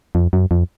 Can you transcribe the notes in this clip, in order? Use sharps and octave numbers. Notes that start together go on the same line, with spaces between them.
F2
F#2
F2